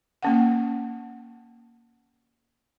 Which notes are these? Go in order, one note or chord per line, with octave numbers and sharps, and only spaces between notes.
A#3 C#4 F#5